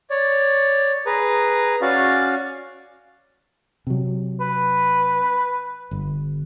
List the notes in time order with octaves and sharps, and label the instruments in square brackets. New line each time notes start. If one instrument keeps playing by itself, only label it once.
[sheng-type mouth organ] C#5 D5
G#4 B4 A#5
C#4 F#4 D5 F5
[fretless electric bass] C3 F#3
[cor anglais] B4
[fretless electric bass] G1